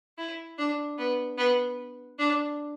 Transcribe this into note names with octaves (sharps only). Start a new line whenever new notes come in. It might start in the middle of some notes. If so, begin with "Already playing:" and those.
E4
D4
B3
B3
D4